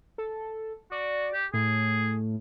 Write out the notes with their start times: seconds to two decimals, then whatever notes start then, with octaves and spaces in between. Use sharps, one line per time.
0.18 A4
0.92 F#4 D5
1.33 G4
1.54 A2 G#4